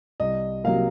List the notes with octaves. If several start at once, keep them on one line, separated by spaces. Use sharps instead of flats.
C2 D#5
C3 F#3 A#3 F5